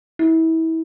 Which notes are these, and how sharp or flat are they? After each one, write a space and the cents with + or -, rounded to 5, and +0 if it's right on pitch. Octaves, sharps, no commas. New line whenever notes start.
E4 -30